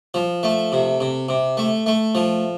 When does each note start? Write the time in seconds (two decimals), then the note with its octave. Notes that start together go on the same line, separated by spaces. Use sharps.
0.14 F3
0.43 A3
0.72 C3
1.01 C3
1.29 C3
1.57 A3
1.86 A3
2.15 F3